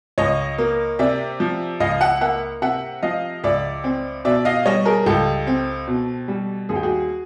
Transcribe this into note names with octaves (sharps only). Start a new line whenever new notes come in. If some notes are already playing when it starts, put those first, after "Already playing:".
C#2 C#5 D#5
A#3
C3 D5 E5
F3
C#2 D#5 F5
E5 F#5
A#3 E5 F#5
C3 E5 F#5
F3 D#5 F5
C#2 D5 E5
C4
B2 D5 E5
D#5 F5
G3 C#5 D#5
G#4 A#4
C#2 G4 A4
C4
B2
G3
D#2 G#4
G4
F#4 G#4